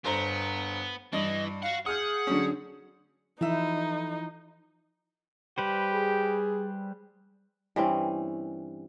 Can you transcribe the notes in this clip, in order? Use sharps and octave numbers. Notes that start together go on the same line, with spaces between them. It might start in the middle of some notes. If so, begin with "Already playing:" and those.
G1 B3 C5 A#5
G2 E3 D#5
F#4 F5 F#5
G#4 F#5 D#6 F6 G6
D3 F#3 C#4
E3 F3 A3 D#4 E4 E5
G3 G4 B4 C5
G#4
G2 E3 C4 C#4